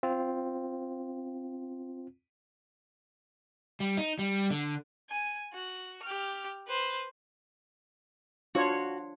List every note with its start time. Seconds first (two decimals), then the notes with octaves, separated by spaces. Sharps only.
0.03 C4 F4
3.80 G3
3.97 D#4
4.19 G3
4.51 D3
5.09 G#5
5.53 F#4
6.03 G4 F6
6.67 B4 C5
8.55 D4 F4 F#4 C#5